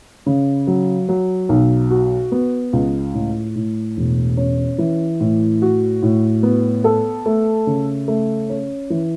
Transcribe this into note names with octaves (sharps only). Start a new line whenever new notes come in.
C#3
F#3
F#3
B1
F#4
B3
C#2
A2
A2
E1
C#4
E3
A2
F#4
A2
B3
A4
A3
C#3
A3
C#4
E3